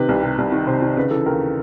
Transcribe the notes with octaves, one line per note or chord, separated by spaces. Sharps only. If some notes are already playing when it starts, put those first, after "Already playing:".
Already playing: C3 D#3 B4
C2
C3
C2
D#3
C3 C5
D#3
C#3 B4
E3 A4
D#2 A#4